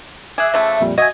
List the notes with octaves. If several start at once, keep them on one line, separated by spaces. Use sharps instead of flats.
G#4 E5 D6 E6 F#6
C#3 F3 A3
F2 A#2 G3
F#4 D#5 E5 G#5 G#6